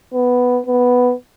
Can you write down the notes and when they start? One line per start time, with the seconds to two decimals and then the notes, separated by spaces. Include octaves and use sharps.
0.14 B3
0.66 B3